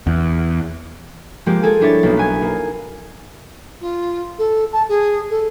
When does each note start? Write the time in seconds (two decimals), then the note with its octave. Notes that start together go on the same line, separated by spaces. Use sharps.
0.07 E2
1.46 F3 G#3 A#3 G4
1.63 G#4 A4 G#5
1.80 G3 D4 E4 C#5 A6
2.03 B1 A#3 D#4
2.17 B3 G#5 G#6
2.42 A#3
3.81 F4
4.38 A4
4.72 A5
4.89 G#4
5.30 A4